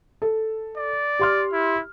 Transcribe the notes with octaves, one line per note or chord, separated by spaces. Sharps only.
A4
D5
G4 C6 F6
E4